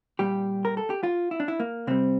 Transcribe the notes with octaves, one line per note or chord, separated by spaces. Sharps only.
A#2 G3 G4
A#4
A4
G4
F4
E4
D4
E4
A#3
C3 G3 C4